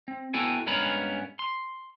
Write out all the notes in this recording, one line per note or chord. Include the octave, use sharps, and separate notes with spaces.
C4
B3 E4 F#4 A4 G5 G#5
G2 G#3 B3 C#4 A#4 B5
C6